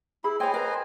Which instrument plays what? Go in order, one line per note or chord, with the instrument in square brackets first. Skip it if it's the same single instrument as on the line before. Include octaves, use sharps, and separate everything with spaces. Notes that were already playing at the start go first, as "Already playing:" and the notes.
[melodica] E4 [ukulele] G#4 B5
[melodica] C5 D#5 G#5 [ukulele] C#5 G5
[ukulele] A#4 B4 A#5